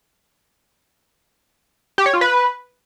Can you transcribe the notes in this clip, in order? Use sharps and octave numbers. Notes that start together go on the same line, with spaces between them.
G4
C#5
F4
B4